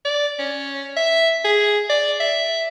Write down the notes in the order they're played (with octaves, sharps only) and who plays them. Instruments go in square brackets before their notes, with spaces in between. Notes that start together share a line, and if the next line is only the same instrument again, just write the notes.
[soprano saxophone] D5
C#4
E5
G#4
D5
E5